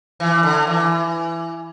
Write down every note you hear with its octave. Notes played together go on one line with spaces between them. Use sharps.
E3
D3
E3